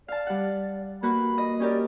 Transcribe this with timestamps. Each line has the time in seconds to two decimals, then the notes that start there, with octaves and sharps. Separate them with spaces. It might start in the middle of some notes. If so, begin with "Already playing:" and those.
0.08 D5 F5 A5
0.27 G3 F#5
1.03 A#3 F#4 B4 B5
1.38 D#5
1.60 C#4 G4 A#4 D5